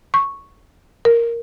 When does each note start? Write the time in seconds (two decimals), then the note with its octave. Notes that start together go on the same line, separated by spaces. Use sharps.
0.14 C#6
1.05 A#4